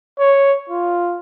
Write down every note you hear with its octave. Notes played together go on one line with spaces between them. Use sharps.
C#5
F4